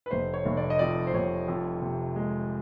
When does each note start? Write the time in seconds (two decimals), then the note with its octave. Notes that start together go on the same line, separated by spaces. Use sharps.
0.06 B4
0.11 F1 C5
0.34 C#5
0.46 F1
0.57 D5
0.70 D#5
0.79 F2 D5
1.07 C5
1.13 F1 C#5
1.48 F2
1.82 C3
2.16 G#3